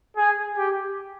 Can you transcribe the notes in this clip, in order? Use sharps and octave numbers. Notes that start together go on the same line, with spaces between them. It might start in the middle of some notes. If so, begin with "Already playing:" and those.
G#4
G4